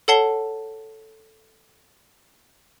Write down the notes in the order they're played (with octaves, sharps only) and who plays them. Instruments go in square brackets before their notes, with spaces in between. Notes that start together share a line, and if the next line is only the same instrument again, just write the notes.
[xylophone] A4 C#5 F#5 A5 C7 G7